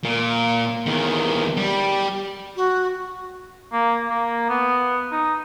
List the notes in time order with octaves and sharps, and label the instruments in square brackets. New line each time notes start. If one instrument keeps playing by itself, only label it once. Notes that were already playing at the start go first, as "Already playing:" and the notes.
[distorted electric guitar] A#2
E2 D#3
G3
[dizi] F#4
[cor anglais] A#3
A#3
B3
D#4